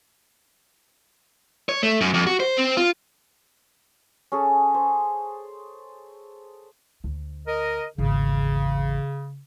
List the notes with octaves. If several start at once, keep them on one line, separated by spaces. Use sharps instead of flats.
C#5
A3
F#2
F2
F#4
C5
C4
F4
C#4 G#4 A4
C5
D2
A#4 D#5
G#1 E2 C#3